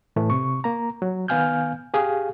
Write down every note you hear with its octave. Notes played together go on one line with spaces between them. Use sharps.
A2 E3 A3
C3 C#6
A#3 A#5
F#3
D#3 B3 F5 G#5 F6 G6
G4 G#4 F5